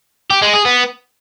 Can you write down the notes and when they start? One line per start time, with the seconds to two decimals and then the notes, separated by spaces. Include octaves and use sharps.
0.31 G4
0.42 G#3
0.54 G#4
0.65 B3